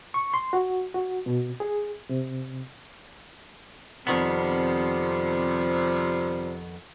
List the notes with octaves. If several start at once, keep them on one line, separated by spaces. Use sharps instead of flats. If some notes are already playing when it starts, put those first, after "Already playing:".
C#6
C6
F#4
F#4
B2
G#4
C3
F2 C3 D#3 F3 G3 B3